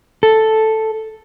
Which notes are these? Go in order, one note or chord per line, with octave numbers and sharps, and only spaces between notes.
A4